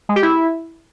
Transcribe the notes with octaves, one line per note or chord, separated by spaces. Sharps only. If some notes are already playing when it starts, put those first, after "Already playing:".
G#3
G4
E4